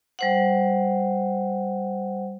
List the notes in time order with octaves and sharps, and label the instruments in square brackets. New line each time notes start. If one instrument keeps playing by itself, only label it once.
[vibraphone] G3 C5 F#5